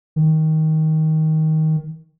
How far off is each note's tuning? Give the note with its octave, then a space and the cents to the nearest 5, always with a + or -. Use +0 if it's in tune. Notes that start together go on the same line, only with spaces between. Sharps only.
D#3 +15